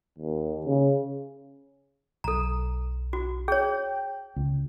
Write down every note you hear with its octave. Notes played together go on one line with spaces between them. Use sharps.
D#2
C#3
B1 A4 A#5
F#4
G#4 C#5 G5
C#2